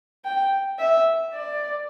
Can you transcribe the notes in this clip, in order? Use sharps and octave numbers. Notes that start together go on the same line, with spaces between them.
G5
E5
D5